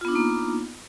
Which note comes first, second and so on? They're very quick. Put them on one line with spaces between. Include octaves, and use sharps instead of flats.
F4 B3 D4 D#4 A#3